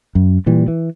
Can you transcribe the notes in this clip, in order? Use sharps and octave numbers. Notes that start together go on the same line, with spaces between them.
F#2
A#2 E3 G3
E3